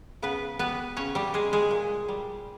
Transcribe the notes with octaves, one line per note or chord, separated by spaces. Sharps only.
C#3 B3 B4
G3 B3 B4
C#3 C#4 C#5
G3 G4
G3 G#3 G#4
G#3 G#4
A#2
G3